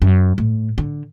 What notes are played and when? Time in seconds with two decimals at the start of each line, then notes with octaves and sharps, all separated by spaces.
0.02 F#2
0.38 A2
0.78 D3